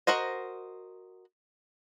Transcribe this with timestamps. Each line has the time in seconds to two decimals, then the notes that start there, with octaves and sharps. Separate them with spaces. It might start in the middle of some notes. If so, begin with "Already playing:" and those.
0.07 F#4 A#4 C5 D#5